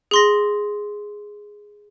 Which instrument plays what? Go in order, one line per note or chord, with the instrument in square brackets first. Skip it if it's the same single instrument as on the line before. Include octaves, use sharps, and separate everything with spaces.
[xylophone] G#4 C6 A#6